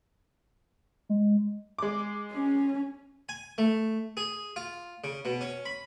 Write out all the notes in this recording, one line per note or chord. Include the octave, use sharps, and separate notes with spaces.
G#3
G#3 D6
C#4
G#5
A3
G#4
F4
C#3
B2
C#4
B5